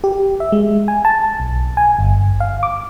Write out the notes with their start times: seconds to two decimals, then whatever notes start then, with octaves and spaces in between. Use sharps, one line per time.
0.04 G4
0.40 E5
0.52 G#3
0.88 G#5
1.05 A5
1.40 B1
1.77 G#5
1.99 G1
2.40 F5
2.63 D6